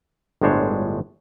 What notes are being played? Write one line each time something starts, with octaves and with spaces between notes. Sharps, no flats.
G1 A2 G#3 D4 C5 C#5